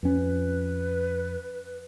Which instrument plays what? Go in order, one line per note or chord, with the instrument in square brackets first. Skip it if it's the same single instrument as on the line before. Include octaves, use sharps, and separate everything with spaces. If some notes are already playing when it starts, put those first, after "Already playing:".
[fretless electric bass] F2 C#4 [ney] B4